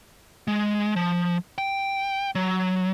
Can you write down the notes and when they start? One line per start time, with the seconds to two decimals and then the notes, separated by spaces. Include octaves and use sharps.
0.48 G#3
0.96 F3
1.58 G5
2.35 F#3